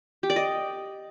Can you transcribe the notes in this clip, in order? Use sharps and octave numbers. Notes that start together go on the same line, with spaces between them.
G4
D5
D#5